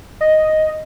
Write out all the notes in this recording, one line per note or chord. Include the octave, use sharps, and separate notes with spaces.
D#5